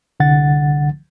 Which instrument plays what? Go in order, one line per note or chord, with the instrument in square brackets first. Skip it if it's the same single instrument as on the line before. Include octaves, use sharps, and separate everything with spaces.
[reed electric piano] C2 D3 F#5 A6